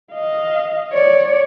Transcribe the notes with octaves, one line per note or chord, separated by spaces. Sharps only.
D#5 F5
C#5 D5